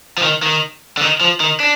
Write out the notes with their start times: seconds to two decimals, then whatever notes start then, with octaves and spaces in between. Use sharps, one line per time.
0.18 F3
0.23 D#3
0.43 D#3
0.98 D3
1.01 D#3
1.21 F3
1.40 D#3
1.60 D4